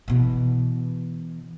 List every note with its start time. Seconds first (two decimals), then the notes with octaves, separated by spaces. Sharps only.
0.08 B2 E3